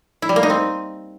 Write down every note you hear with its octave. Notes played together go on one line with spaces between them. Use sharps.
E4
G3
A#3
D#4
C4